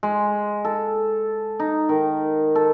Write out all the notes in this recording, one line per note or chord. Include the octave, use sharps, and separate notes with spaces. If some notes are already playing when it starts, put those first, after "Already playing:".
G#3
A4
D#4
D#3
A4